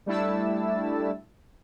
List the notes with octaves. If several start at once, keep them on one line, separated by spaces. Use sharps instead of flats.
G3 A3 D4 E4 A5 E6